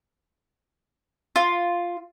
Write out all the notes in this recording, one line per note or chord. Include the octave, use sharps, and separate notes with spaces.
F4